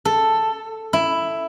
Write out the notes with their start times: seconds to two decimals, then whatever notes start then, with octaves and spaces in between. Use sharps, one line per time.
0.05 A4
0.93 E4